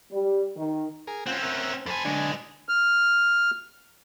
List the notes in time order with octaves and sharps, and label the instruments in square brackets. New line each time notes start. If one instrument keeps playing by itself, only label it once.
[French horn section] G3
D#3
[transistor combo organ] G#4 A#4
[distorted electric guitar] C4 C#4 [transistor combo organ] F4 F#5
[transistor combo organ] A#4 E5 F#5
[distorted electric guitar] F2 G#5 [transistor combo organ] C5 A5 B5
[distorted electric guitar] B1 G#3 [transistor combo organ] D3 D4 G#5
[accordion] F6